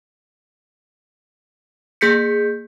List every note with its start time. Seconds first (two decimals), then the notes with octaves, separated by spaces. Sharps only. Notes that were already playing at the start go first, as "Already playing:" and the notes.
2.01 A#3 G#4 G6 B6 C#7